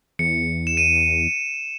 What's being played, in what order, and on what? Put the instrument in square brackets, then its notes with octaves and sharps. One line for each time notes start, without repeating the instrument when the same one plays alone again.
[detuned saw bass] E2 [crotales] C#7
[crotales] E7
D#7